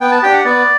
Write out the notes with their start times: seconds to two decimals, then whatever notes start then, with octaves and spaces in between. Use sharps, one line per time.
0.01 B3 G5
0.12 A5
0.22 D4 G4 G5
0.33 F#5
0.45 B3 D5